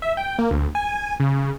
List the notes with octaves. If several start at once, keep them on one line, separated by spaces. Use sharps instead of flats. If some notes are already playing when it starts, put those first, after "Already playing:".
E5
G5
A#3
D2
G#5
C#3